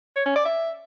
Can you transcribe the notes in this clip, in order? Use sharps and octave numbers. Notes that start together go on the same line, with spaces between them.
C#5
C#4
D5
E5